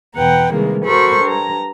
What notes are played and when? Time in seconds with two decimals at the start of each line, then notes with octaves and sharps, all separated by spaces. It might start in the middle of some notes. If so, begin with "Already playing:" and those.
0.15 E2 B2 B4 F#5 G5 A#5
0.53 C3 D#3 E3 G3 G#3 A#3
0.84 F#4 A4 A#4 C5 B5 C#6
1.21 G2 A#5